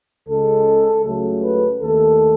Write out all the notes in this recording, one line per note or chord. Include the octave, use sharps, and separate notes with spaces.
C#2 C#3 G#3 A4
C#2 C#3 F#3 A3
B4
D#2 D#3 A3 A4